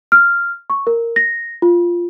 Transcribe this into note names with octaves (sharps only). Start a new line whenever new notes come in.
F6
C#6
A#4
A#6
F4